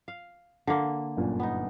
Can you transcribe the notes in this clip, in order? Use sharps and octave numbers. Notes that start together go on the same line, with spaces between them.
F5
D3 A#3
G1 F#2 A#2
B3 D#4